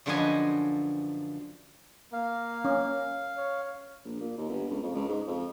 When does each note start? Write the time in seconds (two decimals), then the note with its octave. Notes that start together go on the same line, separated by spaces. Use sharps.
0.06 F#2 D3 F3 B4 D#5 G#5
2.13 A#3 F5
2.65 C#4
3.37 C#5
4.05 A#1
4.20 A#2
4.38 D#2
4.49 G1
4.70 C#2
4.83 F2
4.95 C#2
5.08 G#2
5.27 F2